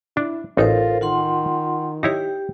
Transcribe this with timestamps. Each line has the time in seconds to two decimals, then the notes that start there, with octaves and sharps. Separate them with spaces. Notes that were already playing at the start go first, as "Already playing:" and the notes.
0.17 D4 E4
0.57 A1 D#4 F4 A4 A#4 C5
1.01 D#3 F4 F#5 C6
2.03 D#4 E4 G4 C#5 G5